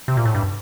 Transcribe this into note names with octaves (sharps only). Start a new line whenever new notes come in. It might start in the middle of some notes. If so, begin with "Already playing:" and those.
C3
A#2
A2
G2